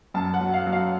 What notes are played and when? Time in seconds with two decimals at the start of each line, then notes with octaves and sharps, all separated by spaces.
0.14 F#2 A5
0.34 F#5
0.40 F#3
0.53 F5
0.67 F#3
0.73 F5